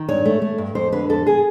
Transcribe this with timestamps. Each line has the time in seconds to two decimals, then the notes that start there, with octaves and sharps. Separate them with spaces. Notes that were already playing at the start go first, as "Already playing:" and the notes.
Already playing: D#3
0.09 G2 C#5
0.25 A3
0.42 A3
0.58 G2
0.75 F2 C5
0.92 D3 B4
1.09 F2 A4
1.27 G#4